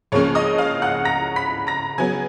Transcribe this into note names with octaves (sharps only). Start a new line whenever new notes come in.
C#2 C#3 F3 A#3 C#4 C#5 C#6
D#5 D#6
F5 F6
F#5 F#6
A#5 A#6
B5 B6
A#5 A#6
C#3 F#3 B3 G#5 G#6